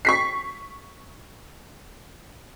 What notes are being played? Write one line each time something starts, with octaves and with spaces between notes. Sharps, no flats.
C#6 B6 C7